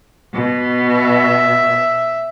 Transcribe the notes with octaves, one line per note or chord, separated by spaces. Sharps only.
B2
E5